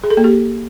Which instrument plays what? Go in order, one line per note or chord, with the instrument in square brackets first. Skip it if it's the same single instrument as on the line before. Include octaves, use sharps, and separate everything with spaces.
[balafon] G#4
A4
A#3
G4